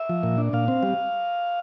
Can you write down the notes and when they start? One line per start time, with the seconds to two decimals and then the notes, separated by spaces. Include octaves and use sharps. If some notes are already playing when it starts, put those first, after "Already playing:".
Already playing: E5
0.09 F3
0.23 A#2
0.38 D4
0.53 A#2 F5
0.68 C4
0.83 G3